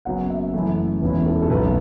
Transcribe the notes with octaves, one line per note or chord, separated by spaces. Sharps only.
F#1 F#2 F#3 B3 F#5
E5
F#2 E3 A3 E4
E1 E2 E3 C#4 E4 B4
A4
A4
B1 B2 A3 B4